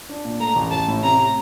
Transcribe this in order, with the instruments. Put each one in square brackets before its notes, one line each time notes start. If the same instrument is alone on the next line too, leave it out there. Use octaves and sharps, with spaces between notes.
[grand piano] D4
A#2
[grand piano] A3 [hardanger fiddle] A#5
[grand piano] A1
[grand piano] A1 [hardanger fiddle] A5
[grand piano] A2
[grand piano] C3 [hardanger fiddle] A#5